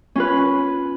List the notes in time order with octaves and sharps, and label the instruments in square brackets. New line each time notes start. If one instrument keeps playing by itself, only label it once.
[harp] C#4 F4 B4